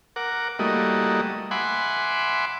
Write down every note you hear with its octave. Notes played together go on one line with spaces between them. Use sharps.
A#4 F#5 D6
G3 A3 A#3 E4 F#4 D#5
E5 F#5 G#5 B5 C6 D6